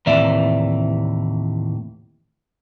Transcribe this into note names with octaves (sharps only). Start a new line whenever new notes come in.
D#2 A2 C3 E3 D5 E5